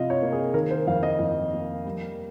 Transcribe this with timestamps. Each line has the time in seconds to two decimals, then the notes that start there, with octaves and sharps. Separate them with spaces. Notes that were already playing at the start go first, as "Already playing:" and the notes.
Already playing: C3 F3 F4 D#5 F5
0.10 C#5
0.22 A#3
0.33 G#4
0.54 D#3 A#4
0.70 C5
0.87 F2 F5
1.03 D#5
1.19 F2
1.52 A#3
1.85 G3